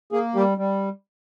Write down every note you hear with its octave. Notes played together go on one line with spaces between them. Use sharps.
A#3 G#4
G3 G4
G3